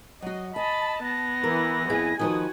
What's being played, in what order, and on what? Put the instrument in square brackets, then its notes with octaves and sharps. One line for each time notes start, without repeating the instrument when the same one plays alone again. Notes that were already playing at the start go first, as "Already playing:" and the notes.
[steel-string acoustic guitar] F#3 F#4 [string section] D#5
[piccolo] D#5 [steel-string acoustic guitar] G#5 [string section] A5 [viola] B5
[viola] B3 [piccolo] A#6
[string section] E3 [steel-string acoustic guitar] A#4
[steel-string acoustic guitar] F2 E4 G#4 [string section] G#5
[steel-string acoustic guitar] D#3 F3 B4 [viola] F#4 [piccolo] D#6